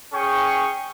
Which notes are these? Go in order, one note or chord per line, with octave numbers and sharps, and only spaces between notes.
C#4 G#4 G5 C#6